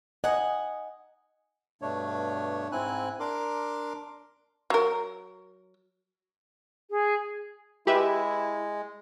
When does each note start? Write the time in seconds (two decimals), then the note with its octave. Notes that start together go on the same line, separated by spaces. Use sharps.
0.24 D#5 F#5 G#5
1.82 G2 B2 A3 D4 C#5
2.72 G#2 C4 E4 G#5 F#6
3.20 D4 A#4 C6 D6
4.70 F#3 A#4
6.90 G#4
7.87 G#3 E4 G4 B4 E5